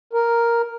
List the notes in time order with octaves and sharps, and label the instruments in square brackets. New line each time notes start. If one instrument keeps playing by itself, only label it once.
[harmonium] A#4